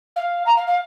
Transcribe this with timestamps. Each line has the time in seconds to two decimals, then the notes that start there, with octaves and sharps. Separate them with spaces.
0.16 F5
0.46 A#5
0.56 F5
0.67 F5